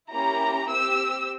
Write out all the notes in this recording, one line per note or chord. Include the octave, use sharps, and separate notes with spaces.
A#3 C#4 E4 G4 A#5
C4 G4 E6